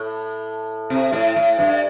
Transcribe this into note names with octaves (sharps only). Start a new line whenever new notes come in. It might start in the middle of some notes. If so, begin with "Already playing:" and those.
Already playing: A2
C3
A2
A2
G2